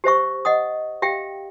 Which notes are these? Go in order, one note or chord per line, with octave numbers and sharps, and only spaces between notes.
G4 C5 E5 C#6
D#5 F#5 D#6
G4 E5 F5 G5